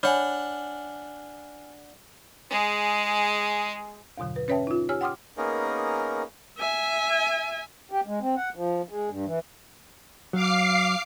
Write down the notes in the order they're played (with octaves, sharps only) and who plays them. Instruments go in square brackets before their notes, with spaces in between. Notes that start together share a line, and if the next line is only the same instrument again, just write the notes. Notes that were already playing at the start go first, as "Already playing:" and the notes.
[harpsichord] D4 F#5 [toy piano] C#5 B5 [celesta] G#5 F6
[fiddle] G#3 G#4
[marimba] E2 G2 B2 D3 F#3
B4
C#4 B4 C#5 E5 G5 A5
D#4 F4
G4 C#5 G#5 E6 F6
F#5 G5 C6 D6 D#6 F6
[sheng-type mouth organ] A#3 B3 C#4 D#4 G#4 A#4
[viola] E5 G#5
[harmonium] G4
G#3
C4
F#5
F3
G#3
G2
E3
[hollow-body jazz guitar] F#3 [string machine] F5 D6 C7